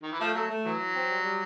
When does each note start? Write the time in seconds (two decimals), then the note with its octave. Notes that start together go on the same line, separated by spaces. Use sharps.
0.03 D#3
0.12 E3
0.20 F3 A3
0.35 F#3 A3
0.49 A3
0.65 E3 F#3
0.80 E3
0.95 C4
1.10 G3
1.23 G3